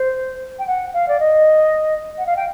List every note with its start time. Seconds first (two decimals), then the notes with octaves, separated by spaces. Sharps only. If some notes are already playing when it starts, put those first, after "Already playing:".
Already playing: C5
0.59 G5
0.67 F#5
0.94 F5
1.08 D5
1.20 D#5
2.18 F#5
2.26 F5
2.36 G5